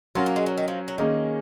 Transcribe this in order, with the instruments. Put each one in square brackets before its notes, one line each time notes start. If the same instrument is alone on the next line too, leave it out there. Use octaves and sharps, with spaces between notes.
[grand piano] F#3 C#4 F#4 A#4 [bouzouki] F4
[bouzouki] A#3
G#3
F#3
D#3
F3
F#3
[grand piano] D#3 A#3 C#4 [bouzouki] G#3